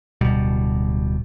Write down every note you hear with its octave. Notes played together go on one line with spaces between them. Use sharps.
D1 B2 G3